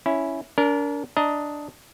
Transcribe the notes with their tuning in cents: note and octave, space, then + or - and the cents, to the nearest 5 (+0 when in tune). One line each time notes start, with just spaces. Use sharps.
C#4 +5 E4 +0
D4 -35 A#4 +0
D4 +0 D#5 +10 A#5 +0